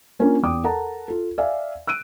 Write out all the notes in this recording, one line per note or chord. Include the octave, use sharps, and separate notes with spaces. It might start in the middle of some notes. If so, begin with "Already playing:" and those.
A#3 C#4 D4 F4 A#4
E2 G5 D6 D#6
A4 A#4 F#5 A5 A#5
F4 A4
D5 E5 F5 G#5
E6 F#6 D7 D#7